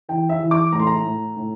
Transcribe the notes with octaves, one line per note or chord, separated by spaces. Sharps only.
E3 G5
E5
E3
D6
A2 A#5
C6
A#5
A2
A2